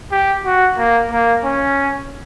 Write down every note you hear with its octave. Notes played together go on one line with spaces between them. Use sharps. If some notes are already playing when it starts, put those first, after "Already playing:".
G4
F#4
A#3
A#3
C#4